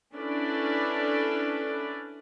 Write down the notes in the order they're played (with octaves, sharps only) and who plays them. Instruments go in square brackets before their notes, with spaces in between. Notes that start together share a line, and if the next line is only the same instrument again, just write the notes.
[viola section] C#4 D4 E4 A4 B4 D5